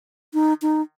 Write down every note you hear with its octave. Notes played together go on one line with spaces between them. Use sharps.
D#4
D#4